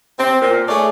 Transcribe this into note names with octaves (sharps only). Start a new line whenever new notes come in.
C4
A#2
A3 G#4 C#5 D5